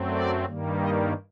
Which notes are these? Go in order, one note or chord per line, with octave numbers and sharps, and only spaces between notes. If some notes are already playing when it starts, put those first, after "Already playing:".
Already playing: F#2 F#3 A3 C4
D5
G2 D#3 G3 A#3
D#5